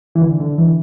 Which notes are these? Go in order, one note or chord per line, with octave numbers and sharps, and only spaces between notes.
E3
D3
D3
E3